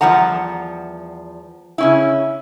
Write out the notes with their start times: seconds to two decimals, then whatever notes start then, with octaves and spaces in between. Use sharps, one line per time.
0.01 E2 F3 G3 F#5 A#5
1.78 C#3 C#4 E4